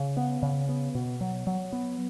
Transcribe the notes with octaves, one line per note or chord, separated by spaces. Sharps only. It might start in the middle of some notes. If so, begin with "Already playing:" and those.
Already playing: C#3
B3
C#3
B3
B2
F#3
F#3
B3